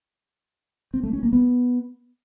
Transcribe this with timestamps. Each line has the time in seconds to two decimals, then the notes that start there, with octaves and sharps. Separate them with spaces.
0.94 C4
1.03 A3
1.13 C#4
1.23 A#3
1.33 B3